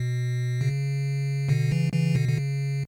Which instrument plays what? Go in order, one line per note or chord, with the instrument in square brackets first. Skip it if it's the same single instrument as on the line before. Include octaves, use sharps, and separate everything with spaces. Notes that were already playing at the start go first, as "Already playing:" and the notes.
Already playing: [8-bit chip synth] B2
C#3
B2 D3
C#3 E3
C#3 E3
B2 D3
D3
C#3